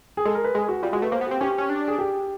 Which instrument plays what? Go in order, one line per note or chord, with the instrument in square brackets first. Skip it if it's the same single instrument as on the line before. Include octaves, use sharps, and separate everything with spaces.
[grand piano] G#4
[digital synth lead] G#3 [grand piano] A4
[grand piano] A#4
B4
[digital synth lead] G#3 [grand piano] G#4
[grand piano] F#4
[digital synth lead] G3 [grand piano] F4
[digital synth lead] G#3 [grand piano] F#4
[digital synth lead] A3 [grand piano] B4
[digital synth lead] A#3 [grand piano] C5
[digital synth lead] B3
[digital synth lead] C4 [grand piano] G4
[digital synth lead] C#4 [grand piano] G4
[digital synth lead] C#4
D4
[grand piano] G#4
G4